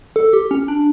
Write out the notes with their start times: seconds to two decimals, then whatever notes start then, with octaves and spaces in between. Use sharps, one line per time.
0.16 A4
0.33 G4
0.51 C#4
0.68 D4